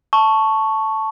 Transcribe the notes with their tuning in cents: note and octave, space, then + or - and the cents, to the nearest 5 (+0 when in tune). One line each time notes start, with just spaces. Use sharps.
A5 +0 C#6 +0